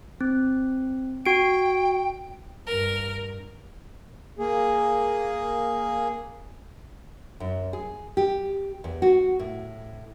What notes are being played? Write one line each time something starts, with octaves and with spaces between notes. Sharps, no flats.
C4
F#4 G5 D7
G2 A#4
A#3 G#4
F#2
G#4
G4
E2
F#4
A2